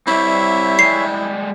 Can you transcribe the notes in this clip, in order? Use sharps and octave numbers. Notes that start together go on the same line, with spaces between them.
G3 C4 E4 C#5 E5
G3 G#3 C7